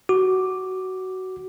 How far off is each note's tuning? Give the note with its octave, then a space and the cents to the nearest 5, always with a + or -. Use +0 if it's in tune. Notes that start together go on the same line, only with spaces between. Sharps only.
F#4 +15 D6 +0